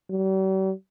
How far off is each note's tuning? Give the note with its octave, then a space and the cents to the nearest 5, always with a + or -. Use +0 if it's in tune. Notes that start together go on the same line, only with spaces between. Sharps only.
G3 -45